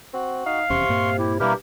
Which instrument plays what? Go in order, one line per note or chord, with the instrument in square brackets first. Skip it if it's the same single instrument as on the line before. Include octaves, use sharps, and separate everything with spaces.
[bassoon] C4 [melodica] F#4
[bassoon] D#4 [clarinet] F5
[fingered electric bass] F1 E2 C#4 [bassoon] C3 [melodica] C6 C#6
[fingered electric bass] G2 A#2 A#3
[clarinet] E4 [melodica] G4
[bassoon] G2 [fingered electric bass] B2 G3 [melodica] A#3 E4 A#4 [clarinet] G4